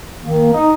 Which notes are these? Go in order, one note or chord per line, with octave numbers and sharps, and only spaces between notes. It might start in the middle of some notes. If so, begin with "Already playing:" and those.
D#3 A#3
D#4